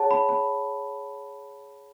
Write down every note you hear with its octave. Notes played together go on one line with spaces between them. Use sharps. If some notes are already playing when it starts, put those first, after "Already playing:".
Already playing: G#4 C#5 F#5 A5
B5
B5